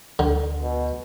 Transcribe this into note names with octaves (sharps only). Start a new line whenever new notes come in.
D2 D3
B2